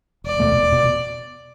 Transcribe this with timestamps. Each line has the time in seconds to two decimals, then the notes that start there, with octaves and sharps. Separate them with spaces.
0.24 E1 D5
0.40 E2 B2 A3
0.55 E1
0.72 B2